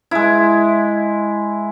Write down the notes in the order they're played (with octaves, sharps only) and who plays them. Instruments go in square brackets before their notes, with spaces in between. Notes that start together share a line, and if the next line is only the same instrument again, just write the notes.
[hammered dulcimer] G#3 E4